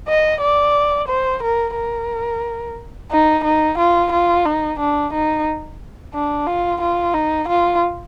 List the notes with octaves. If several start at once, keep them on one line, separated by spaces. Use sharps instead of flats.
D#5
D5
C5
A#4
A#4
D#4
D#4
F4
F4
D#4
D4
D#4
D4
F4
F4
D#4
F4